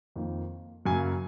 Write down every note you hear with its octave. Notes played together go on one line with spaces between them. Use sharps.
F2 D#3 A#3
F#2 C#3 F#3 A#3 G#5